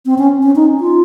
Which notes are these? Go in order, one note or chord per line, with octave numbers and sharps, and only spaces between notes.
C4
C#4
C#4
D#4
F4